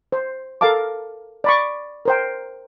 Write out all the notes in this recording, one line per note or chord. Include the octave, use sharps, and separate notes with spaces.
C5
A4 A#4 F5 A5 D6
D5 B5 C#6
A#4 C5 G5